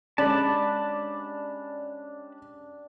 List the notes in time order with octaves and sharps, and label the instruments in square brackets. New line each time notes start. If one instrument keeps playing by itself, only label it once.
[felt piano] G#3 C#4 [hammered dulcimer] D4 G4 [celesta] D5 [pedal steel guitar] A5 B5